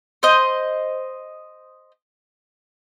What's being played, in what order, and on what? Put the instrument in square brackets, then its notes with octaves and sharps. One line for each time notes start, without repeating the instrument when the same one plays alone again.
[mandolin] C5 D#5